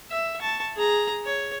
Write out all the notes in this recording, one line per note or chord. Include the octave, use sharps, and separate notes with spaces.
E5
A5 C#6
G#4 A#5
C#5